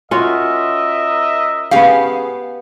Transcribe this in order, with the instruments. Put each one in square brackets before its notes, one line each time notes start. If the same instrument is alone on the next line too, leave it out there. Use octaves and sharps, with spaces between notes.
[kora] C#4 F4 F#4 [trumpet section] A#4 D#5 E5
[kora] B3 G4 [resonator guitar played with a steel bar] C#4 G#4 F5